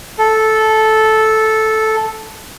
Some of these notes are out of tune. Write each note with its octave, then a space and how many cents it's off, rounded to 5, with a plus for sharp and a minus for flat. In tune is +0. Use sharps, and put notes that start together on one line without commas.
A4 -10